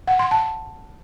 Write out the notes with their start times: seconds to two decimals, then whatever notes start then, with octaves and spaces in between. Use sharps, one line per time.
0.07 F#5
0.19 C6
0.31 A5